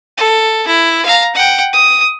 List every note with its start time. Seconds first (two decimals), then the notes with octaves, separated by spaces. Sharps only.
0.18 A4
0.67 E4
1.05 F5 A#5
1.35 F#5 G5
1.73 D#6